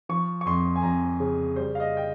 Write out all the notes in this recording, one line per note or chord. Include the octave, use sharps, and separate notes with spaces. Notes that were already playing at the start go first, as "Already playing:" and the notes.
F3 C#6
C#6
F2 C6
G#5
F2 A#5
C#3
G3 C5
F5
D#5
G5